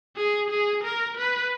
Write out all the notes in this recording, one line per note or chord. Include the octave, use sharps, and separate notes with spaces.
G#4
G#4
A#4
B4